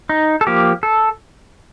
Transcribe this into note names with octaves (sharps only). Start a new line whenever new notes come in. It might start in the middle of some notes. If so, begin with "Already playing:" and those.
D#4
A4
F3 A#3 G4
A4